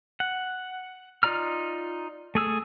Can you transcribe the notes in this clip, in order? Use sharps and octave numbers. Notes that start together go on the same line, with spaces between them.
F#5
D#4 F4 D5 A#5 F6
A3 G#4 E6